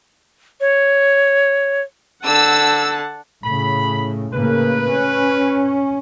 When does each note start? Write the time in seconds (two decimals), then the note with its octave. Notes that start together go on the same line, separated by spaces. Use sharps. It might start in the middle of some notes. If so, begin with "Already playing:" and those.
0.61 C#5
2.25 D3 F#5 A5 E6
3.44 A2 C#3 B5
4.33 A2 C#3 A#3 B4
4.91 C#4